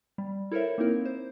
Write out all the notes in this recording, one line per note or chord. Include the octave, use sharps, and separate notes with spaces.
G3
E4 A4 A#4 C5 C#5 E5
A#3 C4 D#4 E4 A#4
C5